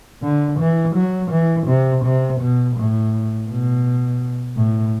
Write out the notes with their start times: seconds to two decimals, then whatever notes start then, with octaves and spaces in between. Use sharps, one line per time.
0.23 D3
0.59 E3
0.96 F#3
1.31 E3
1.67 C3
2.05 C3
2.40 B2
2.77 A2
3.49 B2
4.57 A2